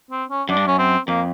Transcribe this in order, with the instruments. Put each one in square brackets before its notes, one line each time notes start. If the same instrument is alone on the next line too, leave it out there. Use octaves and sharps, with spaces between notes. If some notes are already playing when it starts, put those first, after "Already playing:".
[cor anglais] C4
C#4
[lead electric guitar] F#2 [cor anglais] D4
[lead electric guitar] G2
[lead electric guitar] F#2 [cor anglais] C#4
[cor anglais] C4
[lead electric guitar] F2 [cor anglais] A#3